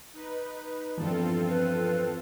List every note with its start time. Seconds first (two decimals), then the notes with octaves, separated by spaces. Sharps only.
0.13 D#4 B4
0.98 E2 G2 E3 F3 C4 F4 A4
1.49 B4